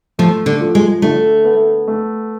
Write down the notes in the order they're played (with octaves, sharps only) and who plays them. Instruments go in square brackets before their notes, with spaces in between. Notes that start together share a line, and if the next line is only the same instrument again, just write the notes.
[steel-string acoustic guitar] F3 [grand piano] A3
[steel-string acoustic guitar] D3
[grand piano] F3
[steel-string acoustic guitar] G#3
[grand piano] D3 [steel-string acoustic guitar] A3
[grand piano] B3
A3